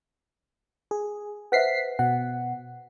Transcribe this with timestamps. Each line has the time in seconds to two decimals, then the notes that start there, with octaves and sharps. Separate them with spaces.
0.91 G#4
1.52 B4 C5 E5 F#5 B6 C7
1.99 B2 F#5